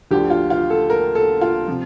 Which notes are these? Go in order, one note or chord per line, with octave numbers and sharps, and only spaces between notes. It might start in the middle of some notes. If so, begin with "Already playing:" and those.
D2 D3 F3 G4
F4
F4
A4
A#4
A4
F4
C3 F3